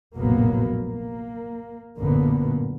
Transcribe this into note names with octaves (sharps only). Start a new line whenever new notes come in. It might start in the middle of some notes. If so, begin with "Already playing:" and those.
F1 A#1 A2 F#3 A#3 B3
A#3
A1 F#2 A#2 D3 A#3 B3